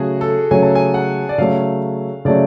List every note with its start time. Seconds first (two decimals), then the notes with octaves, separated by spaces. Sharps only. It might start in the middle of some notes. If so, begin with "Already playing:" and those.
Already playing: C#3 F#3 A3 F#4 G#4
0.21 A4
0.51 C#3 F#3 A3 G#5
0.63 A5
0.75 G#5
0.94 F#5
1.29 D5
1.38 C#3 F#3 A3 F5
2.25 C#3 F#3 A3 D5